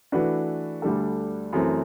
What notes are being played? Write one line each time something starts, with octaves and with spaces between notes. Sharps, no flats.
E3 A3 D4 F#4 B4
D2 D3 G3 D4 A4
F#2 E3 A3 C4